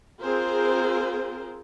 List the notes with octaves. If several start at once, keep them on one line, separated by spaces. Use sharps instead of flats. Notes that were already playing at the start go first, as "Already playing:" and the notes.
C4 F4 G#4 A#4 C5